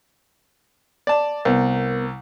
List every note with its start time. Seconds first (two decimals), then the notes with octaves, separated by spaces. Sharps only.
1.07 D5 A5
1.45 C2 B3 A#4